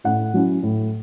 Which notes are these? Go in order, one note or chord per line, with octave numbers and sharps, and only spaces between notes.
A2 F#5
F#3 C#4 E4
A2